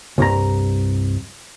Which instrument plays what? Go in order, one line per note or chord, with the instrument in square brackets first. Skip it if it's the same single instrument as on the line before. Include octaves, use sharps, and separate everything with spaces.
[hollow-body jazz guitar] C2 G2 A#5